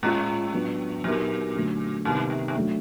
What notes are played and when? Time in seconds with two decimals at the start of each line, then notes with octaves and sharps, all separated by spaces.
0.03 A2 G#3 C#4 F4
0.53 F#3 B3 D4
1.04 A#2 F#3 B3 D#4 G4 A#4
1.55 D3 F#3 A3
2.05 G#2 C3 D#3 G3 B3
2.30 G2
2.48 G2
2.56 F#3 A3 D4